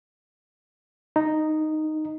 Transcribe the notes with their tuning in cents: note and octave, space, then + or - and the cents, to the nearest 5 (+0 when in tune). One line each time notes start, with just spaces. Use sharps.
D#4 -5